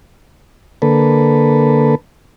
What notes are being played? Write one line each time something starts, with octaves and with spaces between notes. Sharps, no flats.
D3 A#3 A4 B4